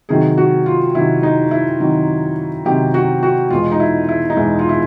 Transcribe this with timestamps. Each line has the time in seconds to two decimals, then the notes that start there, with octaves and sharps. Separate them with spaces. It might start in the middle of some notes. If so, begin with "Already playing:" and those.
0.09 C3 D#3 F#3 G#4
0.38 F#4
0.66 F4
0.95 C3 D#3 F#3 E4
1.23 D#4
1.51 E4
1.80 C3 D#3 F#3
2.65 C3 D#3 F#3 G4
2.94 F#4
3.23 F#4
3.50 E2 B2 G#3 B3 F4
3.72 D#4
3.80 E4
4.09 E4
4.30 D#4
4.36 E2 B2 G#3 B3 E4
4.59 F4
4.69 E4